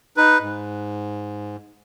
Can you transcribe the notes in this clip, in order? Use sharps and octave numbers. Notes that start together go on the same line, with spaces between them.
D#4 B4
G#2